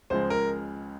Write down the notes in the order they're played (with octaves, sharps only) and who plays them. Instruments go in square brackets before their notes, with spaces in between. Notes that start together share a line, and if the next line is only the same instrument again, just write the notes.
[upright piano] C#2 C#3 F3 G#3 [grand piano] C5
[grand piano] A#4